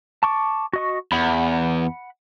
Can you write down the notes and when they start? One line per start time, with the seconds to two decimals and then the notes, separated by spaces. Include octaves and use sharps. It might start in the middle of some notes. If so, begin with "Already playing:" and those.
0.23 A5 C#6 D6
0.73 F#4 D#5 C#6
1.12 E2 F#5 B5